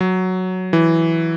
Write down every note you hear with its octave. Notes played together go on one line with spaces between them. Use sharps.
F#3
E3